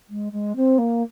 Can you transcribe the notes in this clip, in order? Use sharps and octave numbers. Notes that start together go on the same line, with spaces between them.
G#3
G#3
C4
A#3